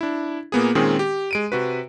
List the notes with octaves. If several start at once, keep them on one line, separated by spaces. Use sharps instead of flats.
D4 E4
A#2 A#3 B3 G#4
A#2 D#3 G#3 C4 C#4 G#4
G4
G#3 D7 D#7
C3 F#4 B4